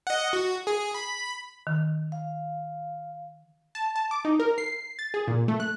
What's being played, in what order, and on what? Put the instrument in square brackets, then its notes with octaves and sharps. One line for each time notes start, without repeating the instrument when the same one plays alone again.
[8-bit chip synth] D#5 F#5
F#4
G#4
B5
[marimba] D#3
[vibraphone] F5
[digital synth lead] A5
A5
D6
D#4
A#4
C7
A6
G#4
A#2
A3
F#6